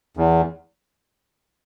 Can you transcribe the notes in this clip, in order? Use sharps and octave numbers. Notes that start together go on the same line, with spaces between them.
E2